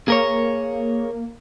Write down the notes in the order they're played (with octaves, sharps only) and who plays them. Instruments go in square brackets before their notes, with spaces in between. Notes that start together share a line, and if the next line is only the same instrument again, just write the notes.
[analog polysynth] A#3 [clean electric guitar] G#4 A#4 C#5